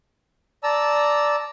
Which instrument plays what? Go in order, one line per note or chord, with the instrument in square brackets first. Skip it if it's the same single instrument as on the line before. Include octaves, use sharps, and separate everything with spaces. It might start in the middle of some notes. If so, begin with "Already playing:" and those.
[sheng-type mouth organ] D5 A5 A#5 E6